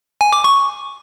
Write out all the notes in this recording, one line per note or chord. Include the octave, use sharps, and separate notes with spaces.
G#5
D6
C#6